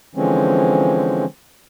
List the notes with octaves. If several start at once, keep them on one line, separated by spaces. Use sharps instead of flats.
D3 E3 F3 G#3 C4 C#4